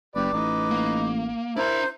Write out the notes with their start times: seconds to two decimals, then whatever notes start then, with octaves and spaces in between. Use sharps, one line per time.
0.15 F#1 G4 B4 D5 D6
0.33 A1 D#4 B4
0.71 A#3
1.56 D4 E4 A#4 C5 A#5